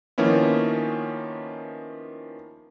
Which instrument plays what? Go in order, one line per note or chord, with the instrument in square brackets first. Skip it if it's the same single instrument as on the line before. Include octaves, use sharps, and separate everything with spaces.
[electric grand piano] D#3 F3 A#3 B3 C#4 E4